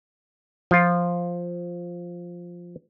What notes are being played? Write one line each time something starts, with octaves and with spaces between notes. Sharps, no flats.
F3 F4